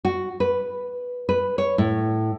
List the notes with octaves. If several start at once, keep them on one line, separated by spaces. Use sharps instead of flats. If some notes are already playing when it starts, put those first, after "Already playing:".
F#4
B4
B4
C#5
A2